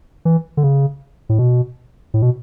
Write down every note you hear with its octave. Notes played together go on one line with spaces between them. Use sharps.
E3
D3
C#3
A2
B2
A2
B2